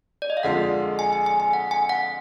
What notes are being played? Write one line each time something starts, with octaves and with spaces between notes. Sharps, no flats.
D5
D#5
F5
F2 D3 G#3 D4 F4 F#5
G#5
G#5
G#5
G#5
F#5
G#5
F#5